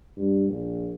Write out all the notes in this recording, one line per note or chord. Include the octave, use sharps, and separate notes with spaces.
G2
A#1